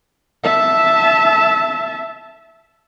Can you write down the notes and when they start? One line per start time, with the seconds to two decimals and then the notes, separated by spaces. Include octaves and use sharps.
0.44 E5 A5